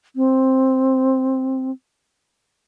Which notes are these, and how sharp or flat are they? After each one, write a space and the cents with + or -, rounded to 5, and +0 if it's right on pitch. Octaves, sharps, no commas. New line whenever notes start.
C4 +5